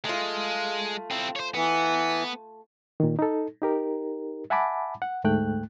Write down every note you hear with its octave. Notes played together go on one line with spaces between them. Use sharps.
G#3 A3 F4
C4 E4
C5 C#5
E3 B3
A#2 D#3
D#4 A4
D#4 G4 A#4
E5 F#5 G#5 A5 B5 D6
F#5
D2 G#2 A3 G5 F#6